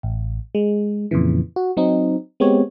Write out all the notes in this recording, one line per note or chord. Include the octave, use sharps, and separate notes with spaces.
A1
G#3
F2 A#2 C#3 E3
F#4
F#3 C4 D#4
G#3 B3 C4 G4 C#5